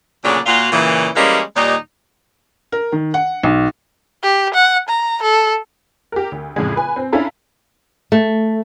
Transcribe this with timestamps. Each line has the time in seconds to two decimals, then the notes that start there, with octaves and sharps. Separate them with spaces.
0.23 D2 A#2 C#3 F#3 D4 D5
0.46 A#2 F4 F#4
0.72 A#2 C#3 E3
1.15 E3 G3 G#3 A#3 C#4
1.56 D#2 A#2 G3 D#4
2.72 A#4
2.92 D#3
3.14 F#5
3.43 B1
4.23 G4
4.54 F#5
4.89 A#5
5.22 A4
6.12 G4 A#4
6.32 D2
6.56 F2 A2 C#3 G#3
6.76 B4 G#5
6.96 C4
7.12 C#4 D4 E4 A4 F5 A#5
8.12 A3